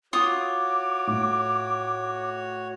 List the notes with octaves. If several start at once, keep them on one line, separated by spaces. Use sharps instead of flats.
F4 F#4 C#5 D6 D#6
A2